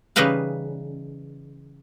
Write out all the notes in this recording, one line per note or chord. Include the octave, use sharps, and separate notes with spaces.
C#3 E3 G3 D#4 B4 F5